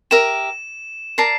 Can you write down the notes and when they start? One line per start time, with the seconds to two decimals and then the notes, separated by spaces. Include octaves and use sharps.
0.11 G4 A#4 E5 E7
1.18 A#4 D5 A5 C7